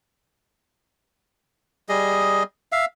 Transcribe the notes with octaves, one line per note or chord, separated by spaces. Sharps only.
G3 G#4 D#5
E5 F5